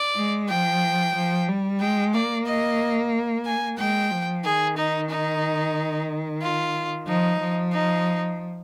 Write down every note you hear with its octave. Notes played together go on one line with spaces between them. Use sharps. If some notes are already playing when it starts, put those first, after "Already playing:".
Already playing: D5
G#3
F3 G5
F3
G3
G#3 G5
A#3 D5
D#5
G#5
G#3 G5
F3
D#3 G#4
D#4
D#4
F4
F3 D#4
F3
D#4